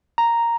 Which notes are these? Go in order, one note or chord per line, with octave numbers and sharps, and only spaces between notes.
A#5